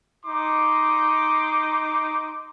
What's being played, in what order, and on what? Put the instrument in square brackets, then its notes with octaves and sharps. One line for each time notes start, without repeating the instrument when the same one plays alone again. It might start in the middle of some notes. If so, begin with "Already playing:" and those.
[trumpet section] D#4 C6 D6